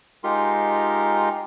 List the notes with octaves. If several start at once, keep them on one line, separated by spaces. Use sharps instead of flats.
G#3 D#4 F4 G4 A#4 C6